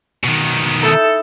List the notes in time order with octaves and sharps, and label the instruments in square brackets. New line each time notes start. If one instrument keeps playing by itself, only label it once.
[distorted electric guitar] B2 D#3
[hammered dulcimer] D#4 E4 [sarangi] A4